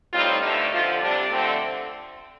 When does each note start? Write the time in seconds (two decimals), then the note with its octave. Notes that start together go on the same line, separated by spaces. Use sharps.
0.13 A2 G3 C4 D#4 F4
0.42 G2 D3 A3 D#4
0.72 F2 D3 F3 F4
1.01 C3 G3 D4
1.31 F2 D3 A3 C4